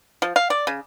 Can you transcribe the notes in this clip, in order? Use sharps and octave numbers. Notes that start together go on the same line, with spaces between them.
F3
F5
D5
C#3